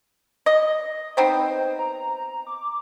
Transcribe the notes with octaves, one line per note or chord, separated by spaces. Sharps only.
D#5
B3 C4 D#4 C5
A#5
D6